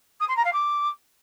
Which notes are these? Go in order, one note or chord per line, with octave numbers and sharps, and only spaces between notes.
D#6
C6
A#5
F5
D6